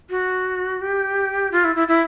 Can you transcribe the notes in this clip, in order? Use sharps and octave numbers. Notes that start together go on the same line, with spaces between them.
F#4
G4
F4
E4
E4
E4